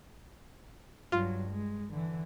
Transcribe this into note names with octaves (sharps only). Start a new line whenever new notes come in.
G2 F#3 F4
G#3
D3 E3